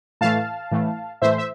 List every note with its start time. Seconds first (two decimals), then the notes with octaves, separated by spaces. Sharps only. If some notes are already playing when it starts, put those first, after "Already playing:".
0.21 A2 E3 A3 F5 A5
0.71 A2 E3 A3
1.22 A2 E3 A3 C5 E5
1.38 E5